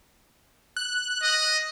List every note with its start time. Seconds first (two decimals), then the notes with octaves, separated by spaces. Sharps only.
0.77 F#6
1.22 D#5